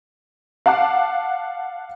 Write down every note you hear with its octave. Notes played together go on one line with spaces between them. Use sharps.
F5 F#5 A5 D6 F#6